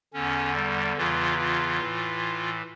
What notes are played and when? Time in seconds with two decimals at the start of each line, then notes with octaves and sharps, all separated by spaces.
0.14 E2 D3 C#4
0.55 G3
0.97 E2 C#3 E3 F4
1.38 F4
1.79 A2 E3